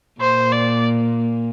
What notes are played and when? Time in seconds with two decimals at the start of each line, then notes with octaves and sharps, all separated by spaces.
0.21 A#2 C5
0.52 D5